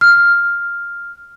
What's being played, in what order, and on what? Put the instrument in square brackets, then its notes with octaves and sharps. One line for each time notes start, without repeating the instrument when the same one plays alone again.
[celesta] F6